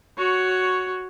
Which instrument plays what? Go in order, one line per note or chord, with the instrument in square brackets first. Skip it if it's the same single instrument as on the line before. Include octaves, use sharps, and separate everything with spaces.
[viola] F#4 C#5